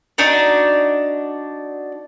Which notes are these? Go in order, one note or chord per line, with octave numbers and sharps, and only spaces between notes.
D4 D#4 F#4 D5